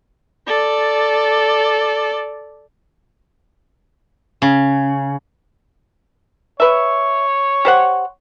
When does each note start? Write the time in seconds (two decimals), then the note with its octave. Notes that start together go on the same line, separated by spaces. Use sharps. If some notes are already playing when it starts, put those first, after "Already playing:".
0.47 A4 D5
4.42 C#3
6.60 B4 C#5 E5
7.65 G4 C5 F#5